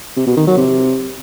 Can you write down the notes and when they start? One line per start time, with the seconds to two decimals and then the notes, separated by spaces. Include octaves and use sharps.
0.16 C3
0.27 B2
0.37 D#3
0.47 F#3
0.57 C3